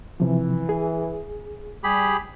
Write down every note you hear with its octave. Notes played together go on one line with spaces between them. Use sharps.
C3 E3 F3
G#4
G3 G4 G#4 B5